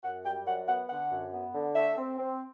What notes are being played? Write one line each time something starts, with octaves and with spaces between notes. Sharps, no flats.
F#2 F#5
G3 G5
F#2 F#5
B3 F#5
D3 F#5
F#2
B3
D3
A3 E5
C4
C4